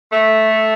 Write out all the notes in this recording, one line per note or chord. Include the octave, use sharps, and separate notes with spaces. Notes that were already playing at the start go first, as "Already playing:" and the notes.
A3